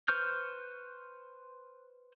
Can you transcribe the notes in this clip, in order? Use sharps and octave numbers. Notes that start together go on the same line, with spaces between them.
B4 C5 C#6 F6 G6